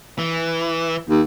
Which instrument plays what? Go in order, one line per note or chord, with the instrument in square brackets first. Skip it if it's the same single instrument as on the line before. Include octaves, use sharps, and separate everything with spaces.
[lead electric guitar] E3
[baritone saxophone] D#2